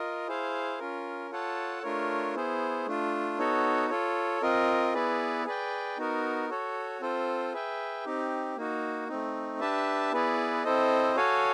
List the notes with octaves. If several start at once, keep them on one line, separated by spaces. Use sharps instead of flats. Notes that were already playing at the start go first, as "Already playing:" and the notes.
Already playing: F4 A#4 D#5
E4 G#4 C5 F5
C#4 F4 A#4
F4 A4 C#5 F#5 A5
A3 D4 F4 A#4 C#5
B3 E4 G#4 C5
A3 D4 F4
B3 D#4 F#4 A4 C#5
F4 A4 C#5
C4 F4 A#4 D#5
B3 E4 G#4 B4 D5
G#4 B4 D5 G5
B3 D#4 F#4 A#4
F#4 A4 C#5
C4 F4 A4 C5
G#4 B4 E5 G5
C4 D#4 G4
A#3 D#4 F#4
A3 C4 D#4
D4 G4 B4 E5 A5
B3 E4 G#4 B4 D5
C4 E4 A4 C5 D#5
F#4 A4 C#5 F5 G#5